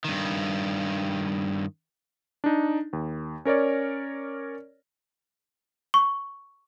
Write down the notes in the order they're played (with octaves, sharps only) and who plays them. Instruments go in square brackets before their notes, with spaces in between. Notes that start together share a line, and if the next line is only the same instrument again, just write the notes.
[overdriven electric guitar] G2 D#3
[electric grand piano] D4 D#4
D#2
C#4 A#4 C#5 D5
[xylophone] C#6